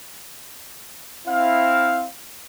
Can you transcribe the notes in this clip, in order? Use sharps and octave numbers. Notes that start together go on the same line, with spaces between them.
C4 E4 F5